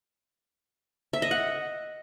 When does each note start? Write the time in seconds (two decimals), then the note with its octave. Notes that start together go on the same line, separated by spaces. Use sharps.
1.13 E5
1.22 D#5
1.31 F#5